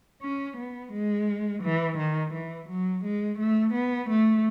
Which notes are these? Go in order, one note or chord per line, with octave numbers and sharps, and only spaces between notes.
C#4
B3
G#3
E3
D#3
E3
F#3
G#3
A3
B3
A3